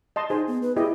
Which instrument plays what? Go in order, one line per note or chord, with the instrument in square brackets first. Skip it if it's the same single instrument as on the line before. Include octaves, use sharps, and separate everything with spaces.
[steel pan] D#5 A5 C6
[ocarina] D#4 [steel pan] G#4 C5
[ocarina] B3
B4
[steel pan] E4 G4 D#5 [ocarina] G#4